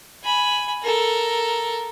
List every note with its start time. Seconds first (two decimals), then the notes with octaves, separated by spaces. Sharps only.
0.23 G#5 B5
0.82 A4 A#4